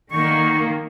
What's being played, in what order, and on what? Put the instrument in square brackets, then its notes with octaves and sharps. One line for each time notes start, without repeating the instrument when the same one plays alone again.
[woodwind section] D3 D#4 C#6 [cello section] D#3 A#3